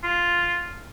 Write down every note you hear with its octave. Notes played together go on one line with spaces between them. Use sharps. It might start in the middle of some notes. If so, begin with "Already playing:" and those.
F4